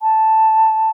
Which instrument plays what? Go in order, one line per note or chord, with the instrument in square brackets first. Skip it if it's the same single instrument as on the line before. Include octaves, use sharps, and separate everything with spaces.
[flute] A5